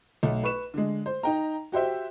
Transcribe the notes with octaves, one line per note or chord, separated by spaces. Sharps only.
B1 A3
B4 C#6 E7
D3 G#3
C5
D#4 G5 A#5
F#4 G4 C5 E5 G5